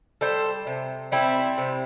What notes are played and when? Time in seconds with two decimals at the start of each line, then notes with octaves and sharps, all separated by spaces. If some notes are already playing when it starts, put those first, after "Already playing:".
0.21 G3 A4 C5
0.67 C3
1.12 G3 C4 E4
1.58 C3